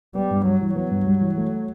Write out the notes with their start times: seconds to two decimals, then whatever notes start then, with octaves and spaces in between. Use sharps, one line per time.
0.15 G3 B3
0.30 G2
0.45 F#3 G3
0.60 E3
0.75 F#3 B3
0.90 G2
1.05 G3
1.21 E3
1.37 A3